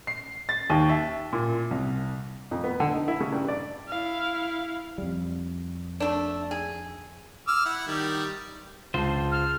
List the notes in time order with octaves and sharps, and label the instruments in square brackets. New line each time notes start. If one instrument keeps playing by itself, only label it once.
[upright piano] C7
A6
D#2
E5
A#2
C2
[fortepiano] F2
B3
D3
D#4
E4
C#3
G2
D5
[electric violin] E4 F5
[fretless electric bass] F2 G3
[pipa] A3 D4
G#4
[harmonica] D6 E6 F6
E4 F#5
D#3 G3
[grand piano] C#2 A5 [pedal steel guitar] F4 C5
[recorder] F6